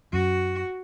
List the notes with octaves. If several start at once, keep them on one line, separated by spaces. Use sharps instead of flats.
F#2 F#4